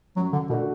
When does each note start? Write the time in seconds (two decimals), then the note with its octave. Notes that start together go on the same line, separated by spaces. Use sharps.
0.16 F#2 F#3
0.33 D3
0.50 B2 D3 A3 D4 F#4